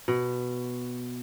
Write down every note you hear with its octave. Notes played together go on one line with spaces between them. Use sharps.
B2